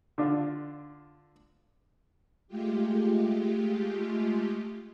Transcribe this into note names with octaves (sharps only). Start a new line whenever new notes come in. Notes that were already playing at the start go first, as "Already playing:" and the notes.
D3 D4 F4
G#3 A3 F4 G4